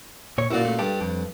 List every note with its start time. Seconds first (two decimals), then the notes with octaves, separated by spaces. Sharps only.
0.38 A#2 C#5
0.51 F#2 A#2 E4 F#4 D5
0.65 A3
0.79 G2 G4 A4
1.01 F2